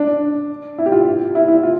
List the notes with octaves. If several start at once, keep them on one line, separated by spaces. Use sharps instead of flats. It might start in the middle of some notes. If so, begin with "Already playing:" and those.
Already playing: D4
E4
G4
F4
E4
E4
F4